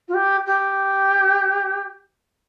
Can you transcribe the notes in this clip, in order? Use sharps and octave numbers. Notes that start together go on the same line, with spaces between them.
F4
G4
G4